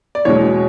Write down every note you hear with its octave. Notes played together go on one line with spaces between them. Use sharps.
D5
E2 B2 G#3 C#5